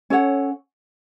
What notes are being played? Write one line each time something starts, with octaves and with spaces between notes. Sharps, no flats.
C#4 A4 C#5 F#5